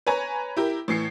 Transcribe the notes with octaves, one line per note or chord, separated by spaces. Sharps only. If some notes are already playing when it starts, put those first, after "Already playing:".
B4 C#5 G#5 A#5
E4 G4 A#4
A2 E3 C7 C#7